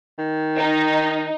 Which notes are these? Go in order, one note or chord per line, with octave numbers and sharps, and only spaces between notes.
D#3
D#4